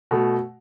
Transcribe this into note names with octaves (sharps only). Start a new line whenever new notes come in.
B2 A3